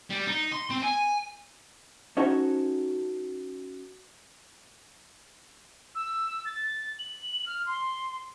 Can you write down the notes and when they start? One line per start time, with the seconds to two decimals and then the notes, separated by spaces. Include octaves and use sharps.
0.10 G3
0.27 D#4
0.52 C6
0.70 C4
0.83 G#5
2.17 C#4 D#4 F#4 A4 C5 C#5
5.95 E6
6.45 A6
6.99 F#7
7.46 F6
7.66 C6